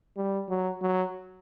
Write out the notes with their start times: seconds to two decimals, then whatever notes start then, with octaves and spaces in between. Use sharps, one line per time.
0.17 G3
0.49 F#3
0.82 F#3